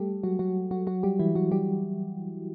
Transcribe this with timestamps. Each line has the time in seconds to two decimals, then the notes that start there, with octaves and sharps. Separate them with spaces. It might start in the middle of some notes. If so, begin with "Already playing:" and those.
Already playing: G3 A3 G4 A4
0.23 F#3 F#4
0.39 F#3 F#4
0.71 F#3 F#4
0.87 F#3 F#4
1.03 G3 G4
1.19 E3 E4
1.35 F#3 F#4
1.52 G3 G4